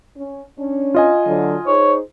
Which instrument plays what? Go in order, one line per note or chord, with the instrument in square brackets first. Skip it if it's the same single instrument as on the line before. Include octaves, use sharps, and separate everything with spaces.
[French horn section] C#4
C#4 D4
[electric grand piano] F4 D#5 G#5
[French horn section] D3 F#3
[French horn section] D#4 G#4 C5 [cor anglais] C#5